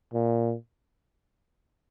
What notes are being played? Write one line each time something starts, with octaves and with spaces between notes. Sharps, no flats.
A#2